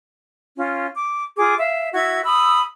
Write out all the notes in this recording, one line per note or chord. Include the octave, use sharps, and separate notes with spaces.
C#4 F4
D6
F4 G#4 D6
E5 F5
E4 F#4 E5 G#6
B5 D#6 E6